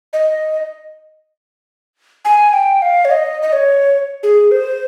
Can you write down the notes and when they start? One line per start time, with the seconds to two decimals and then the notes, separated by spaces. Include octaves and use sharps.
0.13 D#5
2.25 G#5
2.53 G5
2.82 F5
3.05 C#5
3.11 D#5
3.42 D#5
3.53 C#5
4.23 G#4
4.51 C5